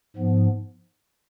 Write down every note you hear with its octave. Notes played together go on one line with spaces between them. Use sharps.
G#2 F3 B3